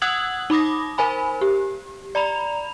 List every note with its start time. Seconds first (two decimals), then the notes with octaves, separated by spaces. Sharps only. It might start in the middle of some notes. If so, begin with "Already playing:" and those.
0.02 F#5 D#6 E6 F#6 G#6 F#7
0.50 D#4 B5 D6 D#6 A#6
0.98 A#4 C5 G#5 B5
1.41 G4
2.15 D5 A#5 B5 F7